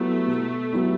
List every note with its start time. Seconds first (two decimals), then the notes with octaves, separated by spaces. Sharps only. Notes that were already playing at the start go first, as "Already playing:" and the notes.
Already playing: F#3 A3 B3 E4 G4
0.27 B2
0.73 F#3 B3 E4 G4